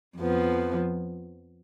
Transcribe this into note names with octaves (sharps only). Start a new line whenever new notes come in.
F2 F3 B3